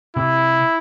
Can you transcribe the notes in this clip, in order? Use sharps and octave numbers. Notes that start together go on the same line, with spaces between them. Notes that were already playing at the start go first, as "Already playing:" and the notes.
C3 E4